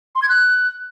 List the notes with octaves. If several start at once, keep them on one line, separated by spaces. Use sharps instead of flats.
C6
G#6
F#6